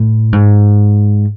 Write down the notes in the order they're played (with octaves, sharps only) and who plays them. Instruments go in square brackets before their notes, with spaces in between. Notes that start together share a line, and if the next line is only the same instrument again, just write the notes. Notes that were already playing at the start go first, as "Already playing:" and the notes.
Already playing: [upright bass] A2
G#2